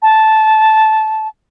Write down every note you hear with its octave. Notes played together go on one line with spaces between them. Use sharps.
A5